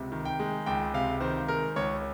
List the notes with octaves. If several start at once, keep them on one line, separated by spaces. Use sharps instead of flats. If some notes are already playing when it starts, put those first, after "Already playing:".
Already playing: C#2 C3
D#3
G5
G#3
C#2 G5
C3 F5
D#3 C5
G#3 A#4
C#2 C#5